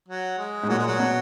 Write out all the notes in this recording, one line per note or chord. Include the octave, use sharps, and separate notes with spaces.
F#3
G#3
G#2
A#2 F#3
G#3
F#3
B2